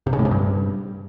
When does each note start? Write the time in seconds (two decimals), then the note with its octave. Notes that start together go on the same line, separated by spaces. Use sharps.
0.07 C3
0.13 C#3
0.19 A2
0.25 C3
0.31 G2